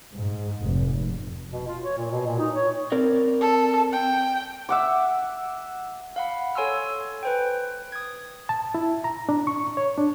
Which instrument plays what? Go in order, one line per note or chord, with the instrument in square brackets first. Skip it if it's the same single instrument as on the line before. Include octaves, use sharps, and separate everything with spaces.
[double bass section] G#2
F1
[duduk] B2
F4
C#5
A#2
B2
A#2
D#4
C#5
[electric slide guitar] C4 A#4 D5
[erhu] A4
G5
[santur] E5 F#5 D6
[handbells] F5 F#5 B5
A4 C#5 G#5 C6 E6 F6
B4 C5 G5
D#6 G#6
[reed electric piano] A5
E4
A#5
D4
C#6
C#5
D4